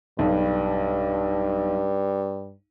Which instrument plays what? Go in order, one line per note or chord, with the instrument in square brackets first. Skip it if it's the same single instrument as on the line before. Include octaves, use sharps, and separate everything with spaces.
[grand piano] B1 [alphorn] G2